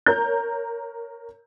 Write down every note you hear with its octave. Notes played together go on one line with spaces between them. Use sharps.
A#4 C#5 A#5 G6